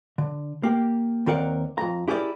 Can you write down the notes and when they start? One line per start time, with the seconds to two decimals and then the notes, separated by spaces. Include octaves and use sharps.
0.18 D3
0.63 A#3 G4
1.26 D#2 D#3 C4 A#4 D5 F#5
1.78 F2 A#5
2.08 E4 G4 G#4 A#4 C5 D5